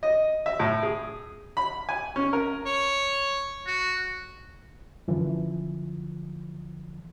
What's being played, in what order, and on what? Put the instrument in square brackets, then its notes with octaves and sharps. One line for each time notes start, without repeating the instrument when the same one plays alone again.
[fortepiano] D#5
E5
A2
G#4
B5
G#5
C#4
A#4
[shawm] C#5
F#4
[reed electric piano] F#2 D3 E3 F3